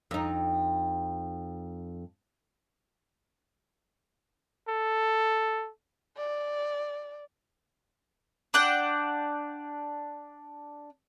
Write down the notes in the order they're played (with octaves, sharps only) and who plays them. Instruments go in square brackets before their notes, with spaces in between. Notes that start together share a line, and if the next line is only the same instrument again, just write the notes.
[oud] F2 D#4
[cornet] A4
[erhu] D5
[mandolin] D4 F#5 G5